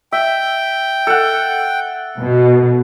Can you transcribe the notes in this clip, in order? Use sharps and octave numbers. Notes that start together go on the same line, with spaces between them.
E5 G5
A4 F#5
B2